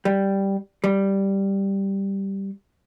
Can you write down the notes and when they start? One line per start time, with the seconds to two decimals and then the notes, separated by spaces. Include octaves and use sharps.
0.05 G3
0.84 G3